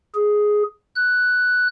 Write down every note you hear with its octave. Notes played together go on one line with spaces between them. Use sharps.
G#4
F#6